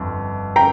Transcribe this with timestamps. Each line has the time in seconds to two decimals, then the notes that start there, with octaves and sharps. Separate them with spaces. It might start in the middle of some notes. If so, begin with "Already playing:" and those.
Already playing: G1 F2
0.56 G5 A#5